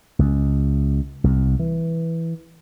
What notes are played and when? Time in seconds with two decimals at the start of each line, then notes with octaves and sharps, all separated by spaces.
0.19 C#2
1.24 C2
1.59 E3